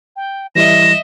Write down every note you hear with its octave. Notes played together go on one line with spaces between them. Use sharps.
G5
E3 G3 E4 D#5 E5 A#6 E7